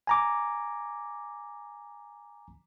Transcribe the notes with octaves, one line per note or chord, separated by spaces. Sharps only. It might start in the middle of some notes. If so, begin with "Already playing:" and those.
G#5 A#5 D6